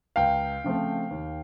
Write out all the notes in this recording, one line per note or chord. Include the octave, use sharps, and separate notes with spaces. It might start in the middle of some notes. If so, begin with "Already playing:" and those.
C#2 F5 G5
C#3 F3 A3 C4
D#2